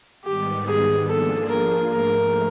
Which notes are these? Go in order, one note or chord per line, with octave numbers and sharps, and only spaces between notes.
G#2 D#3 G3 B3 G4
G#4
F3 A#3 D4 F4 G#4 A4
A#4
G#2 F3 A3 A#4